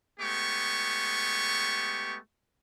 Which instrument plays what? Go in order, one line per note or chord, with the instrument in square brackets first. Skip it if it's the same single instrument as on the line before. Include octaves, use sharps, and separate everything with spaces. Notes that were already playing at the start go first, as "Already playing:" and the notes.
[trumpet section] G#3 A3 B3 G4 C#6